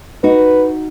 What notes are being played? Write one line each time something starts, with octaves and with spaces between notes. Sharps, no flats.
D#4 F#4 B4